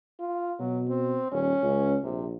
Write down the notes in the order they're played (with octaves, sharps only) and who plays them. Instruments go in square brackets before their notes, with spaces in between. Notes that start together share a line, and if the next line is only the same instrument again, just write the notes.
[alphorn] F4
[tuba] B2 [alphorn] F#3
[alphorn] C4
[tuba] D#1 [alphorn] C#4
[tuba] C#2
[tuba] A#1 [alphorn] C3